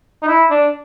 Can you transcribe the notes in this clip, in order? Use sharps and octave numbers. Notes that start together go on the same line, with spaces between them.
D#4
E4
D4